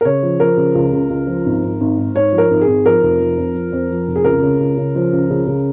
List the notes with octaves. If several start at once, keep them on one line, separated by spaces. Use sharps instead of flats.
A#4
C#3 C#5
F3
F3 A#4
C#3
C#2
C#2
C#2
F3
G#1
G#1
G#1
G#2
G#2 C#5
F3
A#4
G#1
G#4
G#1
F3 A#4
F1
F3
F2
F3
F2
F3
F1
G#4
C#2 A#4
C#3
C#2
C#3
F3
C#2
C#3
C#3